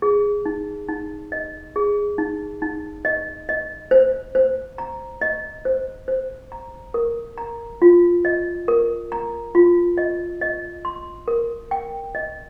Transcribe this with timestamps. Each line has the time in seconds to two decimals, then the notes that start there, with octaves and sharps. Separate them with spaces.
0.02 G#4
0.46 D#4
0.88 D#4
1.32 D#5
1.76 G#4
2.18 D#4
2.62 D#4
3.05 D#5
3.49 D#5
3.91 C5
4.35 C5
4.78 A#5
5.21 D#5
5.65 C5
6.08 C5
6.52 A#5
6.94 A#4
7.38 A#5
7.82 F4
8.25 D#5
8.68 A#4
9.12 A#5
9.55 F4
9.98 D#5
10.41 D#5
10.85 C6
11.28 A#4
11.71 G5
12.15 D#5